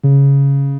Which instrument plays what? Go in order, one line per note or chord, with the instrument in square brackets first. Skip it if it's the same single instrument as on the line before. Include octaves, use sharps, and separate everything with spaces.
[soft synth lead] C#3